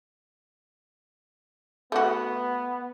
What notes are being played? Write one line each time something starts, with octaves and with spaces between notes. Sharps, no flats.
A3 B3 F#4